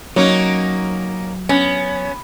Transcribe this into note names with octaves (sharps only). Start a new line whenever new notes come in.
F#3 A#3 C#4 D#4
B3 C#4